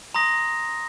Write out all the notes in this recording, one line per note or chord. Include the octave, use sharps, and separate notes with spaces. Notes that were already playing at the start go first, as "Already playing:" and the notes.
A#5 C6 D#6 A#6